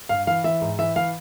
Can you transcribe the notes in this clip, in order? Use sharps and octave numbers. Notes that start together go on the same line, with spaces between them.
G2 F5
E3 F5
E3 E5
G#2
E3 E5
E3 F5